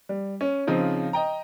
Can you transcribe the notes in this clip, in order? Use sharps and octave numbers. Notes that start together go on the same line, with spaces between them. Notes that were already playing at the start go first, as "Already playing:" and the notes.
G3
C#4
C#3 F3 C4 D#4
D#5 G5 A#5